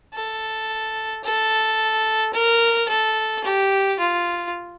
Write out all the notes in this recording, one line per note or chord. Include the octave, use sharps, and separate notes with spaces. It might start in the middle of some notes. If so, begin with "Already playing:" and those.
A4
A4
A#4
A4
G4
F4